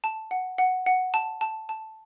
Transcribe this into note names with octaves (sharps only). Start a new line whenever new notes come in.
A5
F#5
F#5
F#5
A5
A5
A5